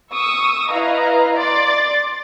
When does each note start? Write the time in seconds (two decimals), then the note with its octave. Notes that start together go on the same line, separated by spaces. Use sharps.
0.12 C#6 D#6 E6
0.71 E4 B4 D#5 F5 A#5
1.36 D5 C6 D6 A6